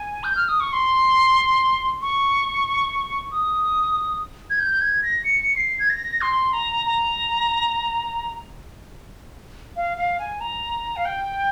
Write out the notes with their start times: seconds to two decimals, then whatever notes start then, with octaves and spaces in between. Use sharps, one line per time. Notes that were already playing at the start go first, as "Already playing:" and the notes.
Already playing: G#5
0.24 G6
0.36 F6
0.48 D#6
0.60 C#6
0.73 C6
2.02 C#6
3.32 D#6
4.50 G#6
4.60 G6
4.81 G#6
5.03 A#6
5.24 C#7
5.57 C7
5.79 G#6
5.90 A#6
6.21 C6
6.53 A#5
6.86 A#5
9.76 F5
9.97 F5
10.19 G#5
10.40 A#5
10.96 F5
11.05 G5